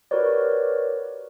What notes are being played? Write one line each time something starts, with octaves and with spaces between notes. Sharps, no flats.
F#4 G4 A#4 B4 C#5 D5